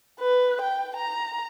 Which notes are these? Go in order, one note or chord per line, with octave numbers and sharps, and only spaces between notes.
B4
G5
A#5